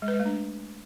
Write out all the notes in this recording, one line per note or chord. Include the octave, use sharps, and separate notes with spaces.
G#3
B4
G#3
A3
D4